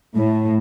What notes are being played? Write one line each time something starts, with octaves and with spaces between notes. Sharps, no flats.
A2